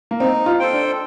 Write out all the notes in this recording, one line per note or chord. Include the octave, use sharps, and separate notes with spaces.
A#3
C4 D#4
F4
A4 C5 G5
D4